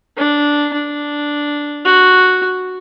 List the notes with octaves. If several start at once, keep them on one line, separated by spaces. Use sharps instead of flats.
D4
D4
F#4